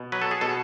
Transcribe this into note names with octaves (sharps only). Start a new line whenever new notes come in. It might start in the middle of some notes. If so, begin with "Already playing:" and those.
Already playing: B2
F#3 B4
A4
G#4
B2 A4